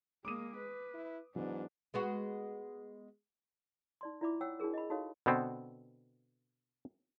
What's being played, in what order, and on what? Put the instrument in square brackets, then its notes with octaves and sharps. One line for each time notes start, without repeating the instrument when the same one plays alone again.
[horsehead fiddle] G#3 A#3 [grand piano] D6 D#6 D#7
[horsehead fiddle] B4
[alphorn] E4
[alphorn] G#2 [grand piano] E3 F#3 B3 [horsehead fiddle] D4
[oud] G#3 B3 F#4
[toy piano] D#4 D5 C6
E4 F4 D5 E5 B5 D6
C#5 F#5 G5 E6
D4 E4 F#4 G#4 A#4
D#5 B5
D#4 F#4 G4 A4 C#5 F5
[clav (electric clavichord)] B2 D3 B3 C4